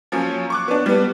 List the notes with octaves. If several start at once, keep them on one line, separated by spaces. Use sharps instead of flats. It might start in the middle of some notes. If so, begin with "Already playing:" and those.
F3 F#3 A#3 C#4
C#6 D6 F#6
B3 D4
G3 B3